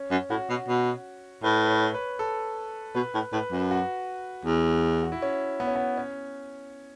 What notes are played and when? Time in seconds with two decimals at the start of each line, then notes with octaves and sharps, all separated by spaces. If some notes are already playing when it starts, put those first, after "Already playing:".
Already playing: C#4
0.11 F#2
0.30 A2 F#4
0.50 B2
0.68 B2
1.44 A2 B4
1.64 B4
1.69 C#5
1.94 B4
2.19 A4
2.95 B2 B4
3.14 A2
3.33 A2 B4
3.52 F#2
3.71 F#4
4.46 E2
5.03 F#4
5.12 E4
5.22 C#4
5.60 B3
5.67 C#4
5.76 B3
5.97 C#4